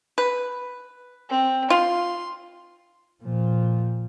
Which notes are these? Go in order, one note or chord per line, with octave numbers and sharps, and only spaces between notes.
B4
C4
F4 C6
A#2 F3